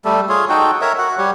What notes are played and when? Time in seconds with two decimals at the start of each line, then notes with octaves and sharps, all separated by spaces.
0.05 G3 A3 A4
0.29 F4 G#4 C#5
0.49 D#4 F#4 A4 G5
0.81 A#4 C#5 E5
0.98 F#4 F#5
1.18 G3 G4 C#5